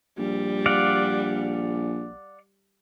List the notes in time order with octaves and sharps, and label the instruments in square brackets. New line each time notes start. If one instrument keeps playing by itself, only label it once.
[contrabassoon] A#1 [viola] G3
[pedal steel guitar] D5 F5 F#5